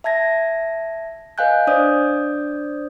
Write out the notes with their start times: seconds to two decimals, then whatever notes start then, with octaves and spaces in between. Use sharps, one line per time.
0.04 E5 A5 G#6 A#6
1.38 B4 D#5 F5 G#5 F#6 G6
1.67 D4 C5 D5 D#6 G6